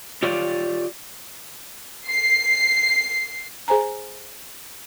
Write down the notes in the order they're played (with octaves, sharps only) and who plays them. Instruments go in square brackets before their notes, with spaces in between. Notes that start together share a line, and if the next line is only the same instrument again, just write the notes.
[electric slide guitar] F4 G4 C#5 D5
[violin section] C7
[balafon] G#4 C5 G#5 A#5